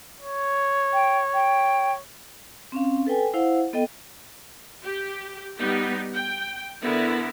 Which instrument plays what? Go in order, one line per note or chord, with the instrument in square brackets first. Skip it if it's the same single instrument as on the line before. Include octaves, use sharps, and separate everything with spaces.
[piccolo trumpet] C#5
[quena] G5
G5
[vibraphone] C4 C#4 F5
A4 B4 G5 G#5
E4 C5 F5 F#5
B3 A4 D#5 G5
[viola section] G4
G3 B3 D#4 G4
G5
D3 B3 E4 A#4